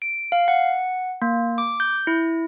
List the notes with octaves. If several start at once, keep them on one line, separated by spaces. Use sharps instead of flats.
D7
F5
F#5
A#3
D6
G6
E4